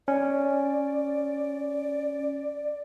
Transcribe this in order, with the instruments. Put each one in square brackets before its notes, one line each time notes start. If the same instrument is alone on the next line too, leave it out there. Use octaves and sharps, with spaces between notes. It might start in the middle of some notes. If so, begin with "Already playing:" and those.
[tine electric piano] C#4 [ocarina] D5